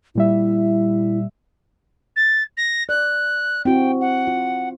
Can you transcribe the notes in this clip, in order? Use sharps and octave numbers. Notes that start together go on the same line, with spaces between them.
A#2 G3 E4 E5
A6
A#6
D5 F#6
C4 E4 F#4 G5
F#5
F4